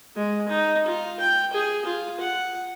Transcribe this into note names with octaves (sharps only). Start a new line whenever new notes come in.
G#3
D#4
F4
G5
G#4
F4
F#5